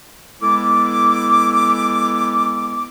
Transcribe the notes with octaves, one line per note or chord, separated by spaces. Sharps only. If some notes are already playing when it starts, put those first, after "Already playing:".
G#3 B3 E4 A4 D6